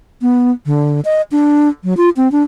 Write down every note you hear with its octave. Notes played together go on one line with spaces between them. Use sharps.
B3
D3
D#5
D4
F#3
F4
C4
D4